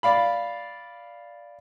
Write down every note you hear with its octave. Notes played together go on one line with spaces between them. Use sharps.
D5 F5 B5